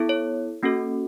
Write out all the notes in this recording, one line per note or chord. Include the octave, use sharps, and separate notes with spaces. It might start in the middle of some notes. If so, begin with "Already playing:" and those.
Already playing: B3 E4 A4
C#5
A#3 C#4 F#4 A4